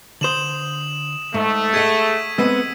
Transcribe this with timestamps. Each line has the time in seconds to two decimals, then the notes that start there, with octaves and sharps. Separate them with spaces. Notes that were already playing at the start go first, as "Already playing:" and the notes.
0.21 D3 C5 D#6 E7 F#7
1.34 G#2 A3
1.74 G#4 D#5 F#5 G#6 B6 D#7
2.38 G#3 B3 C4 E6